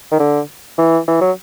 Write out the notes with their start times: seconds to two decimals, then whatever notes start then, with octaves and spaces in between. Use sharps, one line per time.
0.12 D#3
0.20 D3
0.78 E3
1.08 E3
1.21 F#3